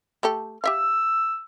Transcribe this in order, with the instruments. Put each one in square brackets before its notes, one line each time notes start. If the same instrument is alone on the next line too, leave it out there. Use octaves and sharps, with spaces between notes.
[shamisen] A3 G4 A4
[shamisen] G4 E5 F5 [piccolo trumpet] E6